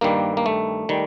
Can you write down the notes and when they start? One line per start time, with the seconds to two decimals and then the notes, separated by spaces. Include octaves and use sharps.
0.01 G2 D#3 G3 A#3
0.37 A#3
0.46 A3
0.89 D#3 G3